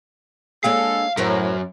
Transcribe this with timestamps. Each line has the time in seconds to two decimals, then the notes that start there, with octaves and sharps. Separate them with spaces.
0.64 G#3 A#3 D4 A4 C#5 F5
1.17 F#2 A2 A#4 C5 C#5